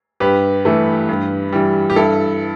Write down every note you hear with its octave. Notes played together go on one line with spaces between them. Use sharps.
G2 G4 B4
E3 A3
G2
E3 G3
G4
G2 E4 A4